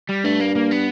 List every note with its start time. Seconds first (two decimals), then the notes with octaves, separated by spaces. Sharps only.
0.09 G3
0.24 G2 A3
0.40 A#3
0.55 A#3
0.71 B3